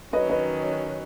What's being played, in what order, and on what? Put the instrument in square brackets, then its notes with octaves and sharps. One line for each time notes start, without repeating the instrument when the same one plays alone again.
[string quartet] D#3 F#3 C#4 [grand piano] B4 D#5
[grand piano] B4 D#5